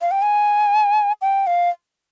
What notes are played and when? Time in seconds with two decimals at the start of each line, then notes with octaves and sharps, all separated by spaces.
0.01 F5
0.11 G5
0.22 G#5
1.21 G5
1.47 F5